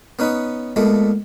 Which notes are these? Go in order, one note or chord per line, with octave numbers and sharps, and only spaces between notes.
B3 C#4 D#4 B4
A#2 G#3 A3 B3